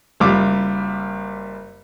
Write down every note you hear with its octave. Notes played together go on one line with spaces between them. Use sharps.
F#1 G3 F4 D6